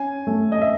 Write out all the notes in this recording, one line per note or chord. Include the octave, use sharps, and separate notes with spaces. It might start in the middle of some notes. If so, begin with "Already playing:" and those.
Already playing: C#4 G#5
A3
D#5
E5